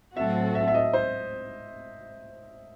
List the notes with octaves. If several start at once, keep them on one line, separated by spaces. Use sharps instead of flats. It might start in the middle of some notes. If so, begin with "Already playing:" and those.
A2 F#3 C4 F#4 A4 E5
E5
E5
D#5
C5